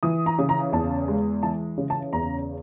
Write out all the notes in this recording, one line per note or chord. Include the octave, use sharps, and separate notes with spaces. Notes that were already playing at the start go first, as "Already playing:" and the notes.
E3 D#6
A#5
C#3
A#5
E2 A5
G#3
E3 A5
C#3
A5
E2 A#5